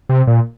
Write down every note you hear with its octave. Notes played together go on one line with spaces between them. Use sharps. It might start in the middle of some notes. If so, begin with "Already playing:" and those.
C3
A#2